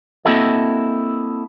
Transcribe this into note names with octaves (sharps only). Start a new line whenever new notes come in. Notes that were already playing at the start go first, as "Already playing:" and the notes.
A#3 C4 E4 F#4 A4 D#5